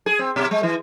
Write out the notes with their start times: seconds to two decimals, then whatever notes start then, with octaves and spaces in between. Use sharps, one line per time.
0.06 G#4
0.19 C4
0.36 B2
0.51 G#3
0.63 E3